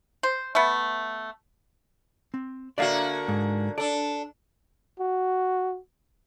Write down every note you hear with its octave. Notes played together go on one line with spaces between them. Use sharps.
C5
A3 B3
C4
D3 A#3 F#4 D5 E5 F5
G#2
D4 A4 D5
F#4